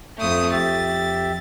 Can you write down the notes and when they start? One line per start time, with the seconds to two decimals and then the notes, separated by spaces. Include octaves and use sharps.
0.19 F2 A3 D#6
0.52 F2 G4 E5 A6